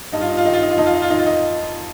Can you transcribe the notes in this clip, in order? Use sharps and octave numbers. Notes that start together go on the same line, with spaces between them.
G2 D#4
F4
D#4
F4
D#3 D#4
F4
D#4
F4
F2 D#4
F4
D#4
F4
D#3 D#4
F4
D#4